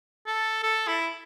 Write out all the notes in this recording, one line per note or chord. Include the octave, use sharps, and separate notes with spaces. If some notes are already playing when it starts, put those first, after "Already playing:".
A4
A4
E4